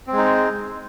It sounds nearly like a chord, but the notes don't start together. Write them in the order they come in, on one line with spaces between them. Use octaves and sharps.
C4 G#3 D#4